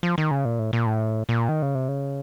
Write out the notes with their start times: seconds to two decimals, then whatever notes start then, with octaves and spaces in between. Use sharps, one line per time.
0.03 F3
0.18 D#3
0.31 C#3
0.45 A#2
0.59 A2
0.73 A#2
0.86 A2
1.29 A#2
1.49 D#3
1.62 C#3
1.75 C3
1.88 C#3